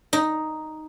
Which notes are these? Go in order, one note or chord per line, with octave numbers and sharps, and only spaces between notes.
D#4